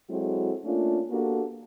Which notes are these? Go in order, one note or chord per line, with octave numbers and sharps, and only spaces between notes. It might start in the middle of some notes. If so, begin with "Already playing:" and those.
F#3 G#3 C4 E4 F#4 A4
A3 A#3 C#4 D4 F4
A#3 B3 D4 F#4 G4 A4